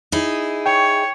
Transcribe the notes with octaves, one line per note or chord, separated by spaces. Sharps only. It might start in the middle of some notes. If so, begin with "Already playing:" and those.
D#4 E4 G#4
C#5 G5